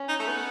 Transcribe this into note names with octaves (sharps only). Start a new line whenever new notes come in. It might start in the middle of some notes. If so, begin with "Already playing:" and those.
Already playing: C#4
D#4
A3
B3